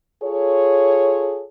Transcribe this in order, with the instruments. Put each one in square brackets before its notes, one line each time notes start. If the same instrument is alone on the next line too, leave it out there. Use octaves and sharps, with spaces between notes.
[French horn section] F4 G#4 A4 C#5